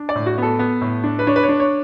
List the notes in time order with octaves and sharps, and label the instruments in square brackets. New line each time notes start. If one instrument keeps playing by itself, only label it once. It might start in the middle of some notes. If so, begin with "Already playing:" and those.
Already playing: [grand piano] D4
D5
A2
F#4
B3 A4
B3
A2
D4
B4
D4 C#5
B4
C#5
D4
C#5